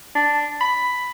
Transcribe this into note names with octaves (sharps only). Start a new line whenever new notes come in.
D4
B5